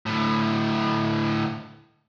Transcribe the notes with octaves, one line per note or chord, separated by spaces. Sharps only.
D2 A2